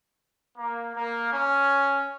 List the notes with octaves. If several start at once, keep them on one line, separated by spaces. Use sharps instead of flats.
A#3
A#3
C#4